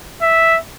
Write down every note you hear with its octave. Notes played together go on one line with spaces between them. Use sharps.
E5